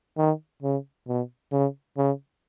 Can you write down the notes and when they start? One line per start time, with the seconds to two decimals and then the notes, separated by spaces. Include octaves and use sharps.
0.17 D#3
0.62 C#3
1.07 B2
1.52 C#3
1.97 C#3